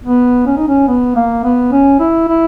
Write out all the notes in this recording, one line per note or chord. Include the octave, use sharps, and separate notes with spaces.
B3
C#4
D#4
C#4
B3
A#3
B3
C#4
E4
E4